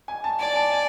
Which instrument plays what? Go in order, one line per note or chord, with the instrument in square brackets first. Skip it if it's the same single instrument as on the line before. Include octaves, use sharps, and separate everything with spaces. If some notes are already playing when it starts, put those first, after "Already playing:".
[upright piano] G#5
A5
[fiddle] D5 [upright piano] G#5
[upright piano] A5
G#5